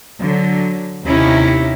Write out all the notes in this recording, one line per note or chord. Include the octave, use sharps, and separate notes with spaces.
D3 F#3
D#2 C3 C#4 D#4 E4 G4